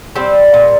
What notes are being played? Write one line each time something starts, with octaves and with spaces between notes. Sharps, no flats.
G3 C4
A#2